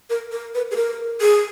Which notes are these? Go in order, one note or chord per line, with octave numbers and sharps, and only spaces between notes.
A#4
A#4
B4
G#4
A#4
G#4